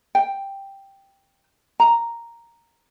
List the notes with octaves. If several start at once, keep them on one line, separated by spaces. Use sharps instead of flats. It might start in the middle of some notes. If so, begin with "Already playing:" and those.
G5
A#5